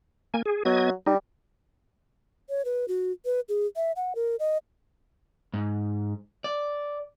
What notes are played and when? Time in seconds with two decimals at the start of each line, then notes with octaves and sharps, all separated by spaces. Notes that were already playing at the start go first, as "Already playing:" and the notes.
0.34 A#3 G#5
0.46 G#4
0.65 F#3 B3 D#5 G#6
1.07 G3 D#4
2.49 C#5
2.65 B4
2.88 F#4
3.25 B4
3.49 G#4
3.76 E5
3.96 F#5
4.15 A#4
4.39 D#5
5.54 G#2
6.44 D5